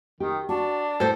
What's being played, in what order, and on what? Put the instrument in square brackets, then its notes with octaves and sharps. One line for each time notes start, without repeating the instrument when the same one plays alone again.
[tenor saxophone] D#3 [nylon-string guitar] G4
[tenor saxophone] D4 [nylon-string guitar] F#4 [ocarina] A5
[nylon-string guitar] A2 [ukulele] A4 C5